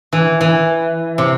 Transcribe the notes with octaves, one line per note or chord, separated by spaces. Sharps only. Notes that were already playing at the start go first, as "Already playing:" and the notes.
E3
E3
C3